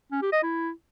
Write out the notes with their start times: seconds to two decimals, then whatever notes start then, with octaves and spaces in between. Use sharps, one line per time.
0.12 C#4
0.22 G4
0.33 D#5
0.43 E4